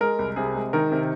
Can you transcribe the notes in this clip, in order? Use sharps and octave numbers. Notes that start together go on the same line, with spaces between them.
G#3 A#4
C2
C3 G#4
G#3
D#3 A#4
C3